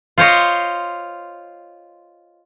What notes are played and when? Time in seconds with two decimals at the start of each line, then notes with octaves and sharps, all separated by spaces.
0.18 F4 C5 C#5 D#5